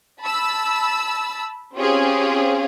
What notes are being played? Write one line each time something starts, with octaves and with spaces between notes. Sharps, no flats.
A5 B5 E6
C4 C#4 F4 G4 G#4